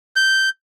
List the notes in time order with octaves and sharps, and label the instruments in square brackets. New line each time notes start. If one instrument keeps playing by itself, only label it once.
[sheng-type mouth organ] G6